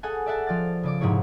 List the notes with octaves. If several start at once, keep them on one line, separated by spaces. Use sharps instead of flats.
G#4 A4 D#5 F#5 G#5
D5 E5 F#5 A5
F3 D5 F6 A6
C#3 D5 D6
F1 G#2 C3 E4 G#4 C#5